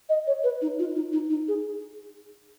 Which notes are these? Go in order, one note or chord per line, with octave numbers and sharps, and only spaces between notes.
D#5
C#5
B4
D#4
F4
D#4
D#4
D#4
G#4